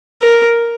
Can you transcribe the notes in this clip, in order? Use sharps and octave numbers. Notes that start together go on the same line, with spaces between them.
A#4